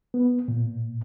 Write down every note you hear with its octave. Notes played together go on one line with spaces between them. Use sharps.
B3
A#2